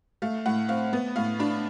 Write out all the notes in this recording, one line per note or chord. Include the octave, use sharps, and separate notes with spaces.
A3 F5
A2 F#5
C4 F5
B3
A2 F5
D4 B5